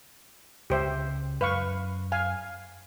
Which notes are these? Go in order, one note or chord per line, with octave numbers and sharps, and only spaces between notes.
C#2 G4 C5 E5
F#2 B4 F5 C#6
F5 G#5